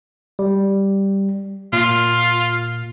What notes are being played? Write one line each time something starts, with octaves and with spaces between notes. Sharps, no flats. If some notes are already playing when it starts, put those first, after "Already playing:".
G3
A#2 F4